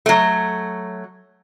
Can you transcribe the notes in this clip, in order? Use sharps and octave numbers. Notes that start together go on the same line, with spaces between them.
F#3 A3